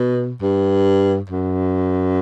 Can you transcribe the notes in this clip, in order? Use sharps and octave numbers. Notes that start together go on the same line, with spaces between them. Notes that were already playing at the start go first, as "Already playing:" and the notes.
Already playing: B2
G2
F#2